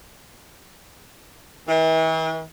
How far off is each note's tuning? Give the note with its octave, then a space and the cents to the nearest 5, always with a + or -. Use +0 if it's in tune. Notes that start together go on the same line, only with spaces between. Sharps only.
E3 -40